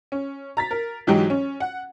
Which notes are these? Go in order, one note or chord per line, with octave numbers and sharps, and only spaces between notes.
C#4
A#5 A6 B6
A#4
G#2 E3 F#3 G#3 D#4 G4
C#4
F#5